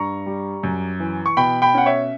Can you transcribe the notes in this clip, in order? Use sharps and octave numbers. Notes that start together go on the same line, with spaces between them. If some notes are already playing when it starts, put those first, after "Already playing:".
Already playing: G2 A#5 C#6
G3
F#2
E3
C#6
B2 G5 B5
G5 B5
C#4 F#5
C#5 E5